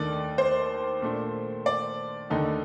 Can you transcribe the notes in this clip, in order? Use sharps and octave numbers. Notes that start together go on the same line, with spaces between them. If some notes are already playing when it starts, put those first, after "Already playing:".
Already playing: D#2 D#3 A3 D4 D5
C5
A#2 A3 D4
D5
D#2 D3 A3 D#4